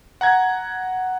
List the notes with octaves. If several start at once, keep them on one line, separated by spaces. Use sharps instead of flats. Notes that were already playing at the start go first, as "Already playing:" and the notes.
F#5 A#5 G#6